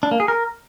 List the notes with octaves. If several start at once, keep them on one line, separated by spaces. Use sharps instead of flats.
D4
A#3
G#4
A#4